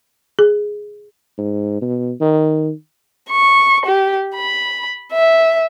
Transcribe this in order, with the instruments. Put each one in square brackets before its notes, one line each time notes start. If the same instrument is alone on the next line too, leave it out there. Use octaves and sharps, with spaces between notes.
[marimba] G#4
[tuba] G#2
B2
D#3
[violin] C#6
G4
B5
E5